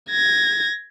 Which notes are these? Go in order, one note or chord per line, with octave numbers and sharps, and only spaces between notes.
G#6 A#6